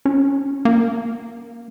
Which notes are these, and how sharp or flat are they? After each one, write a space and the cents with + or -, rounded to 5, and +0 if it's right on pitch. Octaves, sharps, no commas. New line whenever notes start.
C#4 +5
A#3 +10